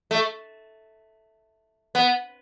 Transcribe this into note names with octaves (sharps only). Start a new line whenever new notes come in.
A3
B3